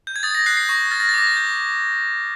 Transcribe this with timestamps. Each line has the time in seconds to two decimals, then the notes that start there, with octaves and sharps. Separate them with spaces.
0.07 G6
0.16 G#6
0.23 D#6 A6
0.35 A#6
0.46 F#6 C7
0.57 C7
0.69 C#6 A#6
0.91 F6 A6
1.00 A#6
1.09 A6
1.14 D6 A#6
1.27 A6
1.37 G6